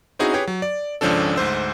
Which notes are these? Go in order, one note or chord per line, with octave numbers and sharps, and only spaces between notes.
C4 C#4 D#4 E4 F#4 G#4
G4 G#4 B4 C#5 G5
F#3
D5
G#1 C#2 F3 C#4 D4 A4
D2 G#2 C5 E6